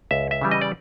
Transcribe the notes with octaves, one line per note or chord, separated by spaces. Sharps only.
C#2 E5
E5
C#3 E3 G3
D#5
D5